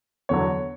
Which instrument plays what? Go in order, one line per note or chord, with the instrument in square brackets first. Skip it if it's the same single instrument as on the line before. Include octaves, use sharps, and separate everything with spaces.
[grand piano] E2 D3 F#3 C#5